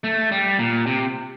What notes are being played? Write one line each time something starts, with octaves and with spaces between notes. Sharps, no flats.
A3
G3
A#2
C3